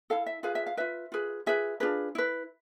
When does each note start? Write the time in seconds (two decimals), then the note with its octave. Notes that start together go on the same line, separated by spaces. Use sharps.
0.10 E4 A4 F5
0.26 E5
0.43 F4 G#4 B4 F5
0.55 E5
0.66 F5
0.77 F4 B4 E5
1.12 F4 G#4 B4
1.46 F4 G#4 B4 E5
1.80 D4 F4 G#4 B4
2.15 E4 B4